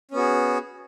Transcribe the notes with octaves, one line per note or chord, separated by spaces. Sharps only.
B3 C#4 F#4 G#4